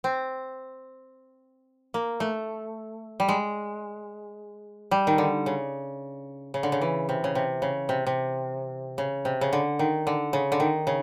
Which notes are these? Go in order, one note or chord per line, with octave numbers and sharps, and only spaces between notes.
C4
A#3
A3
G3
G#3
G3
D#3
D3
C#3
C#3
D3
C#3
E3
C3
C#3
C3
C#3
C3
C3
C#3
C3
C#3
D3
D#3
D3
C#3
D3
D#3
C#3